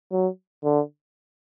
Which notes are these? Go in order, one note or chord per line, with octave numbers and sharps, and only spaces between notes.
F#3
D3